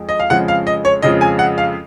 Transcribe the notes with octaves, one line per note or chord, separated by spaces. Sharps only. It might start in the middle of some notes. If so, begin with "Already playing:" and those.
Already playing: F2 F3 G#3
D#5
F5
F2 C#3 F3 G#3 F#5
F5
D#5
C#5
F2 C#3 F3 G#3 D#5
G#5
F#5
F5